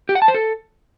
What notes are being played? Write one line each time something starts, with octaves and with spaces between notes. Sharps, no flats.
G4
F#5
A5
C5
A4